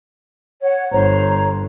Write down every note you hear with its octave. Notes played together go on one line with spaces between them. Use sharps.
C#5 F#5
G1 C5 C#5 A#5